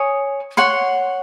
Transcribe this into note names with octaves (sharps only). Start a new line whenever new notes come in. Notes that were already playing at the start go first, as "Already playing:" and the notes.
Already playing: C#5 G#5 D#6
C#5 F#5 C6